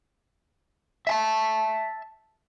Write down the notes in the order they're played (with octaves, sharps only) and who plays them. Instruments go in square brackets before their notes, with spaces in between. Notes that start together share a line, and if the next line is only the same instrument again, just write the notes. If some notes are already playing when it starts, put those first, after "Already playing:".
[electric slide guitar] E5 G#5 A5